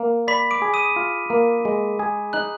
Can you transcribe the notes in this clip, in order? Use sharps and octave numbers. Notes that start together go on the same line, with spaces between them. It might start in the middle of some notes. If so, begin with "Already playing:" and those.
Already playing: A#3
D5 B5 B6
D6 D7
G#4
D#6 D#7
F4
A#3
G#3
G#4
D#4 F#6 F#7